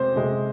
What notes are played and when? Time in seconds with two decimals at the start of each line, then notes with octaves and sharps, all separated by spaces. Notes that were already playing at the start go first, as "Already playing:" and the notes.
Already playing: C3 G#3 C5
0.16 C3 G#3